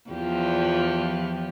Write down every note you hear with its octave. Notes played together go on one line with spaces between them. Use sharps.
E2 F3 G4